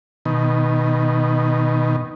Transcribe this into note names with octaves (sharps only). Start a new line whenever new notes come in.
B2 D#3